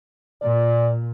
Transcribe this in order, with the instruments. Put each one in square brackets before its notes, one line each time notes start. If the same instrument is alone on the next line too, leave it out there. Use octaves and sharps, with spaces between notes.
[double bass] A#2 [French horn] D5